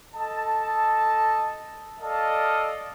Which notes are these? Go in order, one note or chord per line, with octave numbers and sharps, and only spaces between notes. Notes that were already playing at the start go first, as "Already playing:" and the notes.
A4 D#5 A5
A4 D5 D#5 F5 A5